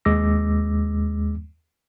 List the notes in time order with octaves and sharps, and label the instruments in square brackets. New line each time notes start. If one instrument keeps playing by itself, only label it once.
[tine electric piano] D#2 G#3 D6 E6 A#6